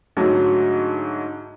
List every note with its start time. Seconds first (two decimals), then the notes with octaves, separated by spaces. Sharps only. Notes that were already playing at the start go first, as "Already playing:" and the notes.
0.17 G#2 D3 F#3 A3